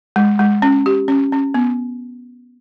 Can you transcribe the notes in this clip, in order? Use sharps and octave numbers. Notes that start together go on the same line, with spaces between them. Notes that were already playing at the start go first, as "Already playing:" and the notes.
G#3
G#3
C#4
G4
C#4
C#4
B3